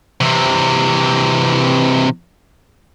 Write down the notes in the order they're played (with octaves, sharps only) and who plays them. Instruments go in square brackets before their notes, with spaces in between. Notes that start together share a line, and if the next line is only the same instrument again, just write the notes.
[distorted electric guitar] C3 E3